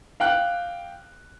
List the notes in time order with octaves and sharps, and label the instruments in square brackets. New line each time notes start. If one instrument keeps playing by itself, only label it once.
[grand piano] F5 G5 F#6